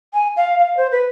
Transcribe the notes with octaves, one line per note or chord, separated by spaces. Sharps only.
G#5
F5
F5
C5
B4